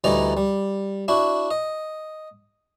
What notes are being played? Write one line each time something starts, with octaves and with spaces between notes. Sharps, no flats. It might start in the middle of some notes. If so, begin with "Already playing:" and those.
D2 E3 G3 D#4 D5 A#5
G3
D4 E4 F#4
D#5